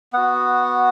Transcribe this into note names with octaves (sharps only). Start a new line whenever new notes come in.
B3 F#4 F#5